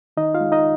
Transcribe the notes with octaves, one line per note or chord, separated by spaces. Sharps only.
D#3 D#4 D#5
F4 F5
G#3
D#4 D#5